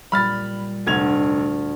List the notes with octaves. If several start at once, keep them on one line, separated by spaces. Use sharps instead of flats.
A#2 G3 B5 F6 A6
F1 D2 G#6 F7